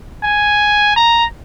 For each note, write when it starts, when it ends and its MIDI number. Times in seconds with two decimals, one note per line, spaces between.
0.24 0.95 80
0.96 1.25 82